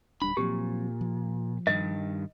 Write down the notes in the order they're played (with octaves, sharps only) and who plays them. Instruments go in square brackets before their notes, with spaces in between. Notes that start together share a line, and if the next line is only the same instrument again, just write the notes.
[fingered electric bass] D1 G3 D4 [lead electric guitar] B5
[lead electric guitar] A#2 [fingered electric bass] F3 F#3 C4 [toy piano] G4
[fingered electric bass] F3
[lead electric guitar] G2 D#3 [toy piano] D#5